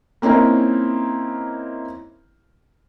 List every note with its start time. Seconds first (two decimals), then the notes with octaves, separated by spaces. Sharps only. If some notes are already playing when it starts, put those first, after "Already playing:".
0.22 A#3 C4 C#4 D#4 E4 A#4